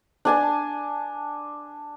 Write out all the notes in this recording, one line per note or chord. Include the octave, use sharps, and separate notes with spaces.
D4 G#5 A5